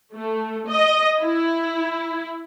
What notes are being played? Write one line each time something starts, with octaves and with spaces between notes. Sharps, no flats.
A3
D#5
E4